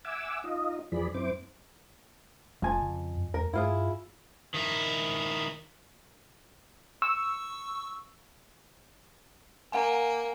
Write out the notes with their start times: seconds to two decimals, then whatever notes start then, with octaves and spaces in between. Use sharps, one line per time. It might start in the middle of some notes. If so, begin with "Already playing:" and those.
0.05 E5 F#5 G#5 D6 E6
0.44 D#4 F4 D#5
0.92 F2 E3 F3 G#4 D5 B5
1.14 F#2 C4 E4 C5 D6
2.62 E1 F2 G#5 A5
2.82 C#3
3.17 F#2
3.34 E2 A#4
3.54 G2 E4 F4 G#4
4.54 D#3 E4
7.02 C#6 E6
9.72 A#3 F#5 G#5